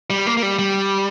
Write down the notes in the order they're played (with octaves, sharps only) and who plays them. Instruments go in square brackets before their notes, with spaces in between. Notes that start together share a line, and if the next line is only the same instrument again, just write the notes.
[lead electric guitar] G3
A#3
A#3
G3
G3